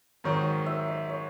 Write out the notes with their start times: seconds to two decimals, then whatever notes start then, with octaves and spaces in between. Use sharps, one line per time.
0.24 G#2 D#3 F#3 C#5
0.66 E5
0.88 D#5
1.09 C#5